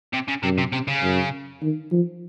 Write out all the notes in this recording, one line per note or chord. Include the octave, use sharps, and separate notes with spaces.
C3
C#3
F#2 C3
C3
C3
C#3
F#2
D#3
F3